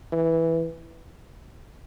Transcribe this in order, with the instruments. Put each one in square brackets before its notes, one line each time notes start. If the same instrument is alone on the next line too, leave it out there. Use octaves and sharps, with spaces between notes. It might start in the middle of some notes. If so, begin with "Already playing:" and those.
[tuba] E3